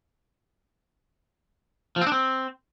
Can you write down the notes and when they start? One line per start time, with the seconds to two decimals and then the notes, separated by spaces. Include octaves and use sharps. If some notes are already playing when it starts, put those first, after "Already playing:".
1.96 F3
2.01 C4
2.07 D4
2.12 C4